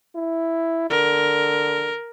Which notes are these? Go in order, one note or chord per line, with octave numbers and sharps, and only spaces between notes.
E4
D3 A#4